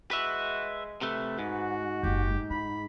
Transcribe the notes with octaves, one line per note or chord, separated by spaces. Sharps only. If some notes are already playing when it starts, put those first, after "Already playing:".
G#3 F#4 B4 E5
C3 A3 B4
G#2 F#4
F#1 G#3 G4
F4 B5